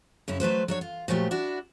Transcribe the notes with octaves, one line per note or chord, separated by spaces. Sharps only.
F#2 C#3 C#4 E4
F#3 A3 B4 C5
F#3 D4 C#5
F4
A#2 F3 F#3 A3 G4
D4 E4 F#4